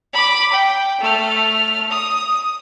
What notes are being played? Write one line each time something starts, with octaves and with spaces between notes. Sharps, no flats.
B5 D6
G5
A3 F6
D#6